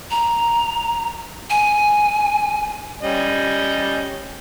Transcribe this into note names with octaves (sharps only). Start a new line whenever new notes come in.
A#5
G#5
G3 C#4 D#5